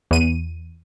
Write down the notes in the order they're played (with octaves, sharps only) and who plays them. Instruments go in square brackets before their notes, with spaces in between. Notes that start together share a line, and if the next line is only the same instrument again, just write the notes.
[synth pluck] E2 D#7